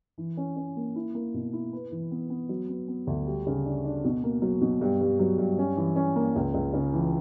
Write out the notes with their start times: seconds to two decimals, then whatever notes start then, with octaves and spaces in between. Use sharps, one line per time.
0.18 E3
0.37 C#4
0.56 C#4
0.77 A#3
0.96 E4
1.15 A#3
1.34 B2
1.53 E4
1.73 B4
1.91 E3
2.11 B3
2.30 B3
2.49 F#3
2.69 B3
2.88 B3
3.07 D2
3.26 G3
3.47 C#3
3.65 D4
3.85 D4
4.04 B2
4.24 A#3
4.42 F#3
4.61 B2
4.81 G2
5.01 G2
5.19 F#3
5.38 G2
5.59 C#4
5.77 E3
5.96 C#4
6.16 A#3
6.36 C#2
6.54 C#2
6.73 C#3
6.93 E3